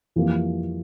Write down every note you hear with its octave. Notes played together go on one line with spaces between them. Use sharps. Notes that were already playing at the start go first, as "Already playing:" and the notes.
F2 E3 G3 A#3 F4